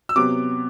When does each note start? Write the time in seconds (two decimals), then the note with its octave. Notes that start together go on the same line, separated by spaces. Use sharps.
0.09 E6
0.16 C3 F#3 B3 D6